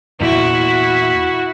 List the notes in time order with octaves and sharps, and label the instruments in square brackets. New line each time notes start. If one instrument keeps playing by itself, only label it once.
[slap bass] E2 A#2 [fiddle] E4 F#4